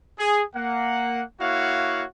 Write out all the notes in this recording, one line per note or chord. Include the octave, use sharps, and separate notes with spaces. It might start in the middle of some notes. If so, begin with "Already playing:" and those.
G#4
A#3 F#5
A#3 E4 F#4 C#5 F5 F#5